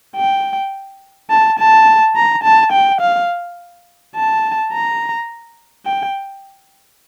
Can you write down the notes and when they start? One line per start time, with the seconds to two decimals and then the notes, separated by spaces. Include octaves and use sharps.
0.16 G5
1.31 A5
1.59 A5
2.16 A#5
2.44 A5
2.72 G5
3.01 F5
4.16 A5
4.73 A#5
5.86 G5